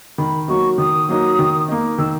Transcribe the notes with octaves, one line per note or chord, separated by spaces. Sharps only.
D#3 B5
F#3 A#3 D#4 F#4 C#6
D#3 D#6
F#3 A#3 D#4 F#4
D#3
A#3 D#4
D#3 E6